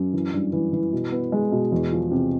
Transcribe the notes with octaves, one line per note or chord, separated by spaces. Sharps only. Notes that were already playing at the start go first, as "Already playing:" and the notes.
Already playing: F#2
E3
G2
E3
E3
B2
B3
G#3
B2
E2
F3
C3